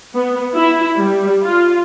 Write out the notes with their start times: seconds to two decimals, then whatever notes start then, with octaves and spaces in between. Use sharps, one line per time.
0.13 B3
0.53 E4
0.96 G3
1.43 F4